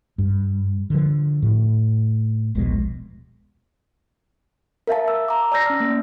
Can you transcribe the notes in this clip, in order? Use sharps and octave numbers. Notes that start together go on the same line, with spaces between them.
G2
D3 F3
A2
D#1 A#1 B2 G#3
A#4 E5 F5 A5
E6
A#5 D6
D5 A5 E6 G6 A#6 C7
C#4 F6
A#3